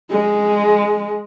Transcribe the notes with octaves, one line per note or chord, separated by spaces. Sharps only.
G#3